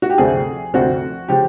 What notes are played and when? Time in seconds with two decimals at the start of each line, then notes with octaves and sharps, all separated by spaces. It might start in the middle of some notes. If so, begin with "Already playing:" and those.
0.02 F#4
0.10 G4
0.18 D2 C3 F3 A3 C4 G#4
0.74 D2 C3 F3 A3 C4 F#4
1.28 C#3 F3 G4